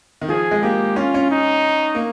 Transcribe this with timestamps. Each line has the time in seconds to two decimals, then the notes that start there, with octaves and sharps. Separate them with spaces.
0.22 D#3
0.29 F3 G#4
0.51 G#3
0.63 A#3 G4
0.96 C#4 F4
1.14 C#4
1.31 D#4
1.95 A#3